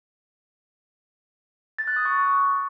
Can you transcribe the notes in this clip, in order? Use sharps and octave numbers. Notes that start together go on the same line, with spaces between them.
A6
F#6
D#6
C#6